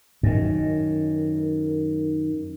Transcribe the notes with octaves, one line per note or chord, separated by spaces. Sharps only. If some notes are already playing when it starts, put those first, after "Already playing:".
F#2 D#3